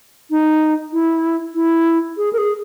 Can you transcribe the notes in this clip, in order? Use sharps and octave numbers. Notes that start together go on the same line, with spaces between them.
D#4
E4
E4
G#4
A#4
G#4